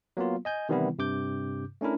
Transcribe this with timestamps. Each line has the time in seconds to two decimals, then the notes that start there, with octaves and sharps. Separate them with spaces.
0.17 F#3 A#3 B3 F4
0.45 D#5 G#5 G6
0.69 C3 D#3 E3 G3 B3 E4
0.99 G2 C3 D6 G6
1.81 A3 C#4 D4 E4 A#4